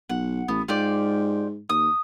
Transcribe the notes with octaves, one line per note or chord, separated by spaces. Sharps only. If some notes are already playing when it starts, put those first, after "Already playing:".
B1 F#5
A1 B3
G#2 F4 G4 D5
D#2 D#6